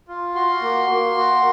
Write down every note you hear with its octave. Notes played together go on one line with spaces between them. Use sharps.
F4
F#4 C6
A#3
A#3
F#4